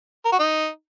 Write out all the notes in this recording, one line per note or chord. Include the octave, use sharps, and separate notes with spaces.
A#4
F#4
D#4